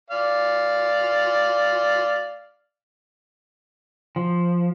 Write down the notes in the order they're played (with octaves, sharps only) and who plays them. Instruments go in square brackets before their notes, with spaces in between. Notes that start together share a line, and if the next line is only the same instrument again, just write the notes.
[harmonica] D5 F5
[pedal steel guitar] F3